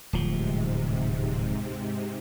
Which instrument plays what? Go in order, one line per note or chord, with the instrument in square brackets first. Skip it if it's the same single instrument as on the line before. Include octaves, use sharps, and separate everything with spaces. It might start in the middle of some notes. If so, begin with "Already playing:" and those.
[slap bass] D1 F3 [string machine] G#2 C3